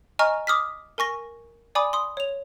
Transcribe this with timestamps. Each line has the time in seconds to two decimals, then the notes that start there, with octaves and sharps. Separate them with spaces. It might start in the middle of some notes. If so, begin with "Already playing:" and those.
0.19 D#5 G#5 A#5 C#6 F6
0.47 D6 D#6 F6 B6
0.98 A#4 G#5 C#6 A#6
1.75 D5 G#5 B5 D6 D#6
1.93 C6 D#6
2.17 C#5 F7